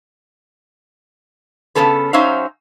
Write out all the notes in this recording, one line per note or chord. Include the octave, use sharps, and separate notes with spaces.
C#3 F3 B3 C#4 A4 B4
F#3 C#4 D#4 C5 E5 F5